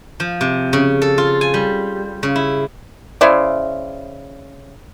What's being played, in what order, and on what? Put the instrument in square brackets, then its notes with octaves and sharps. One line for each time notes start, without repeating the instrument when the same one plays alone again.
[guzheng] F3
C3
C#3
A4
F4
G#5
G3
C#3
E4
[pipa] C#3 E4 C5 D5